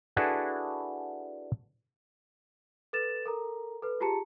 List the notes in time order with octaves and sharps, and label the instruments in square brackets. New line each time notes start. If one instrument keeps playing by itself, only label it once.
[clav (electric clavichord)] D4 E4 F#4 G#4 A4 B4
[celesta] A4 B4 A6 E7
A4 A#4 A#5
A4 B4
F4 G4 G#4 A5 A#5 C#7